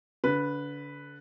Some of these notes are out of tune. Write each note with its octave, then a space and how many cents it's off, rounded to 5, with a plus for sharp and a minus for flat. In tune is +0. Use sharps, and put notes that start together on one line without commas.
D3 -30 B4 +0